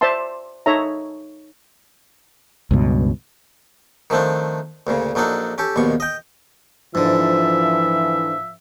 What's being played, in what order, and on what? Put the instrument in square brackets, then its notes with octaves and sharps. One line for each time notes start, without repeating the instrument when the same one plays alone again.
[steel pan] C5 D5 E5 A5 C6
D#4 A4 C#5 E5 A#5
[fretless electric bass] C#2 G2 B2
[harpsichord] D#3 F3 A3 C4 D4
D2 A#2 C#3
A#1 F#3 D4 D#4 A4
C#4 G4 A4
A#1 D#2 B2 C#6
D#5 G5
[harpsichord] G#2 D3 [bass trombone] E3 [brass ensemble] F3 [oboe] E5